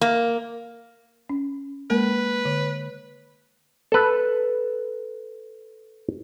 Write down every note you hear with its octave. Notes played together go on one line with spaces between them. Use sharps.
A#3
C#4
G#3 A#3 A#4 B4
D3
A4 B4